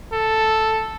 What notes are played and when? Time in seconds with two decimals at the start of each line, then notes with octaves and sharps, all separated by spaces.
0.13 A4